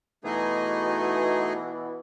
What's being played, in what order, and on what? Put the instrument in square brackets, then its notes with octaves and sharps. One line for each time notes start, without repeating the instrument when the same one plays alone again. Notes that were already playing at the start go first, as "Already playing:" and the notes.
[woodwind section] B2 E3 [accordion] A3 D#4 G#4